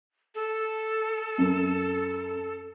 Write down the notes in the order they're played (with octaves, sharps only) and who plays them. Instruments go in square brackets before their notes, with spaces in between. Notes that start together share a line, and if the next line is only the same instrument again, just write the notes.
[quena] A4
[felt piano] F#2